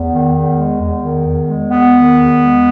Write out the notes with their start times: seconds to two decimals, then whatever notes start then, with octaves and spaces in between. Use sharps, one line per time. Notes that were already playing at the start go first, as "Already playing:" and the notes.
Already playing: E2
0.11 D#3
0.33 E2
0.57 G#3
0.79 E2
1.02 D#3
1.25 E2
1.48 G#3
1.69 E2 B3
1.93 D#3
2.15 E2
2.37 G#3